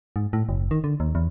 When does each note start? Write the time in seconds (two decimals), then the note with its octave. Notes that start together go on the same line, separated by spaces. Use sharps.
0.16 G#2
0.33 A2
0.49 F#1
0.71 D#3
0.84 D3
1.00 D#2
1.15 E2